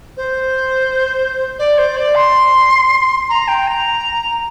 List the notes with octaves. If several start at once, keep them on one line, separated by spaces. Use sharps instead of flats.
C5
D5
C5
D5
C6
A#5
G5
A#5